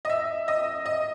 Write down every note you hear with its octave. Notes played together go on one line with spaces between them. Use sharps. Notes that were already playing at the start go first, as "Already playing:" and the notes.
D#5
E5
D#5
D#5